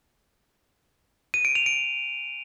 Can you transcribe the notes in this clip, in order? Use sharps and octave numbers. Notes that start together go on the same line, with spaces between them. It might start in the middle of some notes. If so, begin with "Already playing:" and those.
D#7
D7
F7
D7